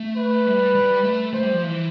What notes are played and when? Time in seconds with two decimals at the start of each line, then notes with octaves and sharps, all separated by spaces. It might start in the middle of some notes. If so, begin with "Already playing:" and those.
Already playing: A3
0.17 B4
0.47 G3
0.75 G3
1.04 A3
1.34 A3 C5
1.43 G3
1.53 F3
1.63 E3